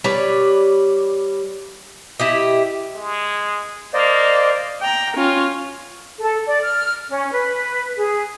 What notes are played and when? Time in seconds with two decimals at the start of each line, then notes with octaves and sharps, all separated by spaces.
0.04 G3 B4 C#5 D5
2.20 E4 G4 D#5
2.95 G#3
3.94 A#3 C5 D5 D#5
4.82 G5 A#5
5.17 C#4 F4
6.21 A4
6.47 D5
6.64 F6
7.09 C#4
7.32 B4
7.97 G#4